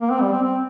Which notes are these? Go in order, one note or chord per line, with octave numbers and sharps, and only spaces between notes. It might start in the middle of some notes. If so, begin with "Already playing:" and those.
A#3
C4
G3
C4
C4